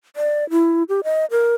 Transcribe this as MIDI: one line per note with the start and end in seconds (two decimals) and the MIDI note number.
0.16 0.49 74
0.50 0.83 64
0.89 1.01 67
1.04 1.25 75
1.31 1.55 70